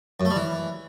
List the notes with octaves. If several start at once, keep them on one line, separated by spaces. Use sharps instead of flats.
F#2
A3
G3
E3